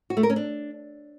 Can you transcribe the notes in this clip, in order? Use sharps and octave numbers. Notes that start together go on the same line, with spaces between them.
F#4
A3
A#4
C#4
D4